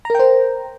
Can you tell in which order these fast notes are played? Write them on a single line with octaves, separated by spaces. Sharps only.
A#5 A#4 G5 C5